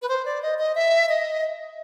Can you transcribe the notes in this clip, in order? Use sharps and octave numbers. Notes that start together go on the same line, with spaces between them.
B4
C5
D5
D#5
D#5
E5
D#5